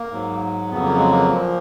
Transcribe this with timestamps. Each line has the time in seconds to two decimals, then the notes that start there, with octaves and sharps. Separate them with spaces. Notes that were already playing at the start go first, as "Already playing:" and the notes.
Already playing: A#3
0.11 G#2 F#3
0.70 F2 C#3 F#3 B3
0.84 A#3
0.98 G#3
1.11 A#3
1.29 A#2 F3